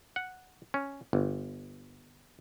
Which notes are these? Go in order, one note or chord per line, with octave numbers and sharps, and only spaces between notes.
F#5
C#4
G1